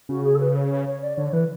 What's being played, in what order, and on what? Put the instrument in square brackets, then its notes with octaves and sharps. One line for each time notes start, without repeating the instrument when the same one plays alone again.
[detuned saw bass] C#3 [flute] F#4
[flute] G#4
A4
B4
C#5
C#5
C#5
D5
[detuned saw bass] D3 [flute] C#5
[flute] C#5
[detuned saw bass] E3 [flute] B4